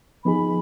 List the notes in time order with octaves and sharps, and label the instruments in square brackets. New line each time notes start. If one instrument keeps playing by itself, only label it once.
[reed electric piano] F3 B3 D#4 G#4 [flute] B5